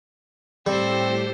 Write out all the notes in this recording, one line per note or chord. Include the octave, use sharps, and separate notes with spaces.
A2 G3 C4 G4 A4 C5